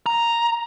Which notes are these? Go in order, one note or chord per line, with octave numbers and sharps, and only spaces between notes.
A#5